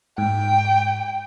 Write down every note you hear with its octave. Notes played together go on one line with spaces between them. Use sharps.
G#2 G5